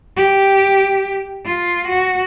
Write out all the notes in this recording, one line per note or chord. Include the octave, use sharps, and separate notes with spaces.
G4
F4
F#4